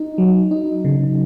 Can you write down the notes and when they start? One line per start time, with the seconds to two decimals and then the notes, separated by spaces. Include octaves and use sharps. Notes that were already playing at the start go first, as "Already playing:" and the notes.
Already playing: D#4
0.18 F#3
0.51 D#4
0.85 C#3